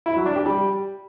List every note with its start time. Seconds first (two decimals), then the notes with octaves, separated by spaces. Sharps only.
0.06 E4
0.16 F#3
0.26 D4
0.36 G4
0.46 G3